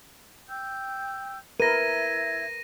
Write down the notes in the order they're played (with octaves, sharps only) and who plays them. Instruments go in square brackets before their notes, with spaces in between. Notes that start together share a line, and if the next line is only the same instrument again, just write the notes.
[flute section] G5 E6 G6
[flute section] E4 E5 G#6 [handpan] A#4 B4 [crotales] A#6 D#7